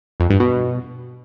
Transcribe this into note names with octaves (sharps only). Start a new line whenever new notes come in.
F2
G2
B2